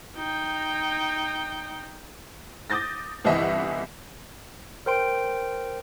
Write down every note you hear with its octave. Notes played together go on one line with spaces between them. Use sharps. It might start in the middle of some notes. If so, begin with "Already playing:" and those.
D#4 G5
D6 D#6 G6 A6 A#6
G1 C2 E3 D#5 E5 F#5
A#4 C5 G5 C6 D7